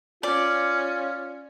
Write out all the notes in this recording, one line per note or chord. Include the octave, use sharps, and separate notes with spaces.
C#4 F4 D5